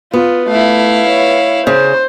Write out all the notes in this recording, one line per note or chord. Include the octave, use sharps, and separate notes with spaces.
B3 F4
A3 E4 F5
C#5
C#3 C5